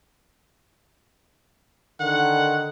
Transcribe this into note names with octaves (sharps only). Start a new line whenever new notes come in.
D3 D#3 F#5